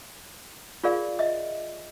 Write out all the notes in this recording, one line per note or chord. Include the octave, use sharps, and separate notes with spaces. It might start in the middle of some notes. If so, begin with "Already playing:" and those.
F4 G#4 A#4 D5 F5
D#5 E5